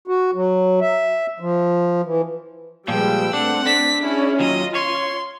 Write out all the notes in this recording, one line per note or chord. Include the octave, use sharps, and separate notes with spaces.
F#4
F#3
E5
F3
E3
A#2 F3 G3 G#3 B4 G5 E6
A3 C4 D4 F#5
D4 B6
C#4 E4 G#4
D#2 F#3 F4 D#5
C#5 C6